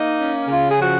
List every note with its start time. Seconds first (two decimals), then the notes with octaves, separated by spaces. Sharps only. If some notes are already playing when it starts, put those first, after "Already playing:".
Already playing: A#3 D#4
0.19 C#4
0.48 C#3 F4
0.68 G#4
0.78 F3 F#4